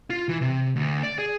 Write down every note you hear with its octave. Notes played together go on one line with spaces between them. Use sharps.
F4
E3
C3
D2
D5
G#4